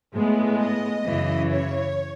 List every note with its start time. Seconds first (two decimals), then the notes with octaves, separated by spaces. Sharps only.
0.14 A2 G#3 B3
0.60 D#5
1.06 F#2 C#3 E3
1.51 C#5